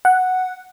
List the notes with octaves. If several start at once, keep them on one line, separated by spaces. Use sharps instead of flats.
F#5